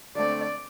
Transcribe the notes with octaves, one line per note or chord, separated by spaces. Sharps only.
D3 A3 C4 D5